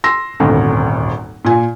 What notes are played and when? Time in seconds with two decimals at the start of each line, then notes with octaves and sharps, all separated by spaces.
0.04 C6 E6 A#6
0.40 D#1 G#1 D2
1.45 A#2 G#5